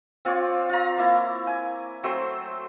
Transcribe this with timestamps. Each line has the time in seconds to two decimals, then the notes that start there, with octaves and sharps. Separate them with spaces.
0.25 C4 F4 C#5 D5
0.69 F4 A#5
0.98 A#3 E4
1.47 G#5
2.03 F#3 A3 C4 C6